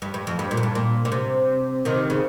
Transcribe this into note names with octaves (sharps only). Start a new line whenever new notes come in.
G2
G2
F2
G2
A#2
F2
G2
A#2
A#2
C3
C3 D#3
C#3